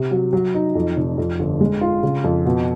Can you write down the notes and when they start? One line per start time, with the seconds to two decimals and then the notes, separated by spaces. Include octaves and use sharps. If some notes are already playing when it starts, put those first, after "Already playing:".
Already playing: C3
0.11 F#3
0.33 F#3
0.54 D#4
0.75 F2
0.97 F1
1.18 F2
1.39 G1
1.61 G#3
1.81 F4
2.03 C#3
2.24 F2
2.45 B2